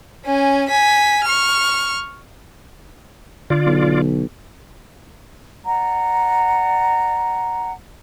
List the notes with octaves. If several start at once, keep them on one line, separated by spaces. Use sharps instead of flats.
C#4 G#5
G#5 B6
C#6 F6
D3 F4 D5
B1
D5 F#5 A#5